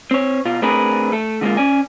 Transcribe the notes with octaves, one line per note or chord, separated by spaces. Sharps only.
C4 C#5
B2 F4
A3 C4 D4 G#4 A#4 B4
A3 A4
D3 G#3 A#3 F4
C#4 D5 G#5